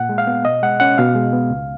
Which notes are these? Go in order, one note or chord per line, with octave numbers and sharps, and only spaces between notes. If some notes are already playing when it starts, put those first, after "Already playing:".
Already playing: A#2 F#5
G#3
F5
B3
B2 D#5
G#3 F#5
C#4 F#5
B2 F5
G#3
B3
C#2